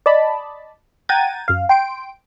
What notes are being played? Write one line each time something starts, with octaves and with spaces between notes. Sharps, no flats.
D5 D#5 A5 B5
F#5 G5 A#5 G#6 A6 D#7
F#2 F5
G5 C6 D7